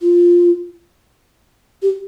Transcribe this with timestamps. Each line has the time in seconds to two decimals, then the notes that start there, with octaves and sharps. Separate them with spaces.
0.02 F4
1.82 G4